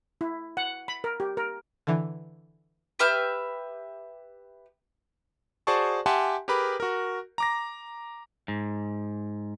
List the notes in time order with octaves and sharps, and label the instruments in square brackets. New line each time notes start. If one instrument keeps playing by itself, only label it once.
[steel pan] E4
F#5
B5
A#4
G4
A#4
[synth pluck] D3 E3
[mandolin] G4 B4 E5 F6
[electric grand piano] F#4 G#4 C5 D5 A5 C#6
G4 E5 F#5 G#5 A5 C6
G4 G#4 A#4 B4 B5 D6
F#4 A#4
A#5 D6 A#6
[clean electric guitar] G#2